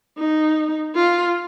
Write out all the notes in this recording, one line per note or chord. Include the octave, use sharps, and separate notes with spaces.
D#4
F4